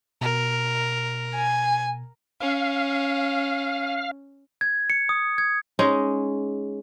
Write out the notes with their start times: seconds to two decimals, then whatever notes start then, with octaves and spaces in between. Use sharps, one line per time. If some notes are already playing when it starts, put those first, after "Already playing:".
0.21 B2 A#4
1.36 G#5
2.40 C#4 F5
4.61 G#6
4.90 C#7
5.09 D#6
5.38 G#6
5.79 G#3 C#4 D#4 G#4